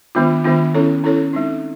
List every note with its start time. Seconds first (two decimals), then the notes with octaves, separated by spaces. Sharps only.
0.15 D#3 G#3 B3 D4 F4
0.45 D#3 G#3 B3 D4 F4
0.74 C#4 E4 A4 C#5
1.04 C#4 E4 A4 C#5
1.33 G#3 C4 D#4